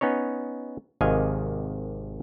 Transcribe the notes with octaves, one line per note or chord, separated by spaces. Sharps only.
B3 C#4 D#4 C#5
G#1 C3 D#3 D#5 F5 G#5